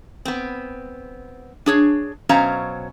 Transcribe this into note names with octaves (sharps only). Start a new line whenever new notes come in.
B3 C4
D4 G#4 C#5
B2 F#3 C#4 C5 F5 A#5